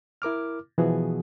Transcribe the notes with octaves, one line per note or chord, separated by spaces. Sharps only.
E4 A#4 D6 F6
B2 E3 F3 B3 F#4 G#4